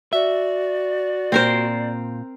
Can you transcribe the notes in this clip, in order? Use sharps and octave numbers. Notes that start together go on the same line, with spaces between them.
F#4 D5 E5
A#2 C4 A#4 C5